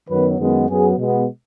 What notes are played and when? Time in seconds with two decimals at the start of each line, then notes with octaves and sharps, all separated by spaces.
0.09 F#2 D#3 F#3 B3 B4
0.39 F#2 D#3 G#3 B3
0.69 F#2 F#3 B3 G#4
0.97 B2 G#3 B3